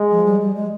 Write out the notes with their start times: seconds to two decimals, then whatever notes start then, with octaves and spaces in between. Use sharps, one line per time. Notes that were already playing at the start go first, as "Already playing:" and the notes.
Already playing: G#3
0.11 F3
0.25 G3
0.41 G3
0.55 G#3